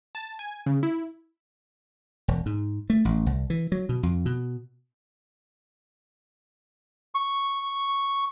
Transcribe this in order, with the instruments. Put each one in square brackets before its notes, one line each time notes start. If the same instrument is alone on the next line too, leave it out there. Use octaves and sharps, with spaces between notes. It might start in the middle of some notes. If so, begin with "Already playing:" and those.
[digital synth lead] A5
G#5
C#3
E4
[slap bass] E1
G#2
A3
A1
C2
E3
F#3
B2
F2
B2
[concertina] C#6